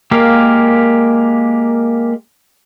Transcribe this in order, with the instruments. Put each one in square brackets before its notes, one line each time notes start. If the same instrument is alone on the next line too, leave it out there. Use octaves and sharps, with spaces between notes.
[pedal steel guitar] G#3 A#3 G4 A#4 F5